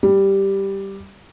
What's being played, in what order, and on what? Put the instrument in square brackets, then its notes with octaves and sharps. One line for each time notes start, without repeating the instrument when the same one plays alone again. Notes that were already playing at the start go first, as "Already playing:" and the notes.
[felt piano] G3